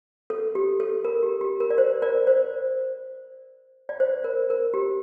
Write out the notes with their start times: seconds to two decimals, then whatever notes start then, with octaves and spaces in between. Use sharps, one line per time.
0.30 A4
0.55 G4
0.80 A4
1.04 A#4
1.23 G4
1.41 G4
1.60 A#4
1.70 D5
1.78 C5
2.02 A#4 D5
2.27 C5
3.89 D5
4.00 C5
4.24 A#4
4.50 A#4
4.74 G4